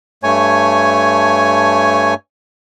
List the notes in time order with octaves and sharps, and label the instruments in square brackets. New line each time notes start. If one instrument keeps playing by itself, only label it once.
[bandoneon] G2 A3 C#5 G#5